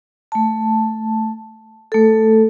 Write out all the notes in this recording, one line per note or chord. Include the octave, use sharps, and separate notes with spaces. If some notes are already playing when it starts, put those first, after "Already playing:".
A3 A5
A3 A4